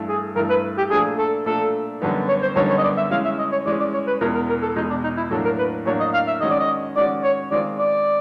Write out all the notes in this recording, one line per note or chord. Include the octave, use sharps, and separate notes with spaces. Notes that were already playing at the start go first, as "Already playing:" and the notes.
Already playing: G2 E3 A3
G#4
G2 E3 A3 A#4
B4
G4
A#2 F3 A3 D4 G#4
A4
A#2 F3 A3 D4 A4
F#2 D3 G3 B3 D#4
C#5
C5
F#2 D3 G3 B3 D#4 C#5
C#5
D#5
D5
E5
E3 G#3 C#4 F5
E5
D#5
C#5
E3 G#3 C#4 D5
D5
C#5
B4
E2 B2 G#3 A#4
A#4
A#4
A4
E2 B2 G#3 D#4
D4
D#4
E4
A2 F#3 A#3 D4 A4
A#4
B4
A2 F#3 A#3 D4 C#5
D#5
F5
E5
D#3 G#3 C#4 F#4 D#5
D5
D#5
D#3 G#3 C#4 F#4 D5
C#5
D#3 G#3 C4 F4 D5
D5